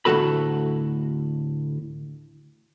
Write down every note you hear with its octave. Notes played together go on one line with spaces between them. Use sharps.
D2 A2 C3 F#4 A4 B5